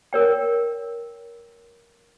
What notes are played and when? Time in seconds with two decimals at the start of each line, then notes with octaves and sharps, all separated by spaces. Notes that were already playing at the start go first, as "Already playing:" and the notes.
0.13 A#4 C#5 G5